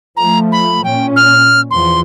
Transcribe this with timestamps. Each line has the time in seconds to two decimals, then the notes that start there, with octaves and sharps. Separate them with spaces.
0.17 F3 A3 A#5
0.52 B5
0.84 A#2 C#4 G5
1.16 F6
1.71 E2 F3 C6